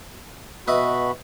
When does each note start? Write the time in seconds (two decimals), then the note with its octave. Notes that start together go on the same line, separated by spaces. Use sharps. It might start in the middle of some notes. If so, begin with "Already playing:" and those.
0.68 B2 F#4 B4 D#5 E5 B5